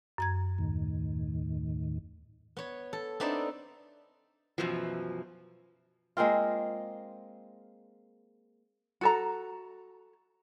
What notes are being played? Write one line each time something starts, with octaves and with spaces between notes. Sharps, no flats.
F#2 A#5 G#6
D#2 A2 D#3
B3 C#5
A4
B3 C4 D4 D#4 D5 E5
F#2 B2 E3 F3
G#3 A#3 C4 F4
F#4 A4 A#5